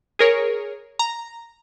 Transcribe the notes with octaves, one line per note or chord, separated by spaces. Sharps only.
G#4 A#4 C#5
A#5